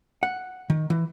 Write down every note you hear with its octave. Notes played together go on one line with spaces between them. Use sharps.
F#5
D#3
E3